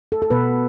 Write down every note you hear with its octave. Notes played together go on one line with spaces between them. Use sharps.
A4
A4
B2 B3 B4